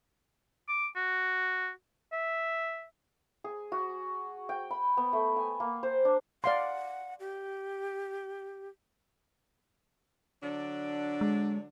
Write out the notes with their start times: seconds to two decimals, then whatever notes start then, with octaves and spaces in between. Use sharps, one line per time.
0.68 D6
0.96 F#4
2.12 E5
3.44 G#4
3.72 F#4
4.49 G5
4.71 B5
4.97 B3
5.13 A3
5.37 G#5
5.60 A#3
5.83 C5
6.05 D4
6.44 D5 F5 F#5 C6
7.20 G4
10.43 D3 F#3 D4
11.21 G#3